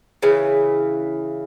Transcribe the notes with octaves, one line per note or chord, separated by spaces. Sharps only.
C#3 E3